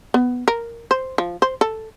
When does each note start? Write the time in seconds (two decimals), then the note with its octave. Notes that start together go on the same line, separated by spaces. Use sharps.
0.14 B3
0.48 A#4
0.91 C5
1.18 F3
1.42 C5
1.61 A4